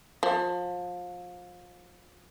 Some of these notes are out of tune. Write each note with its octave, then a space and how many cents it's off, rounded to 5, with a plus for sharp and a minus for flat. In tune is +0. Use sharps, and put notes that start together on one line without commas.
F3 +30